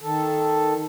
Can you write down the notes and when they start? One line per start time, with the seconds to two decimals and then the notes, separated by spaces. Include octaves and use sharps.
0.01 D#3 A4